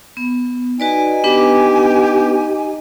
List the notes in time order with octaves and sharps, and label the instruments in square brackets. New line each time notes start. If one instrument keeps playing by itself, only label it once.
[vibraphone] B3
[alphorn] D#4 [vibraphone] F#4 B4 D5 [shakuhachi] G#5
[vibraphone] B3 D4 B4 [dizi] G4